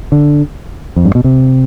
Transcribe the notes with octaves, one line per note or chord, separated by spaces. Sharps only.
D3
F2
G2
B2
C3